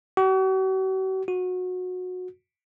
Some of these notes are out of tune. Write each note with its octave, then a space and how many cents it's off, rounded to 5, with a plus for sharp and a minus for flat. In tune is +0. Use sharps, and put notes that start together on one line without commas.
F#4 +45
F#4 -20